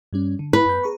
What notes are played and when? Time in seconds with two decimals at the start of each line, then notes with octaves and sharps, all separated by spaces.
0.13 G2 G3 C#4
0.39 D3
0.53 E4 B4
0.65 F#2 G6
0.83 G#4 A#5 C#6